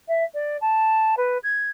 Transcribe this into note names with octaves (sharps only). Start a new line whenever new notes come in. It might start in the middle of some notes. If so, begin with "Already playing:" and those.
E5
D5
A5
B4
G#6